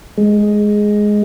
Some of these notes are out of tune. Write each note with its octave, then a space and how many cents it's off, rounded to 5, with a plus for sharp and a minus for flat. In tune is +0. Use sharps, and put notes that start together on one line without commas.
G#3 +5